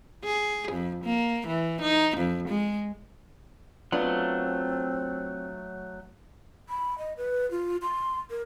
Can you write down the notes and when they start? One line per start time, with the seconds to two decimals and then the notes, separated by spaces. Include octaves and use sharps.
0.24 G#4
0.72 F2
1.04 A#3
1.47 E3
1.81 D#4
2.17 F2
2.48 G#3
3.92 F#3 A3 B3 C4 D4 F4
6.69 B5
6.98 D#5
7.17 B4
7.51 F4
7.82 C6
8.30 A#4